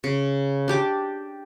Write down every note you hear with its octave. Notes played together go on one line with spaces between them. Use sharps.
C#3
D4 G4 D6